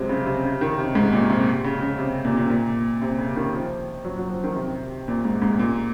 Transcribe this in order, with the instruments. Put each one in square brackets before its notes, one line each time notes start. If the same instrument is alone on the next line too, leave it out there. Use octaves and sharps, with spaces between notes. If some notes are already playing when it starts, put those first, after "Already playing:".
Already playing: [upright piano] C3 F3 F#3 G#3
C#3
C3
C#3
D#3
C3
G#2
A#2
C3
C#3
C#3
C3
A#2
A#2
A#2
C3
C#3
D#3
F3
F#3
F#3
F3
D#3
C3
A#2
G#2
G#2
A#2